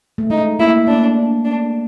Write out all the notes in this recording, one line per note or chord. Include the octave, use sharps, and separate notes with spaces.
A3
G#3 D#4
A#3 E4
A#3 D4
D4